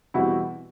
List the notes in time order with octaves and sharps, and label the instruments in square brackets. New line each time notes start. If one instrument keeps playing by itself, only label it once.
[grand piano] E2 B2 G3 C4 E4 F#4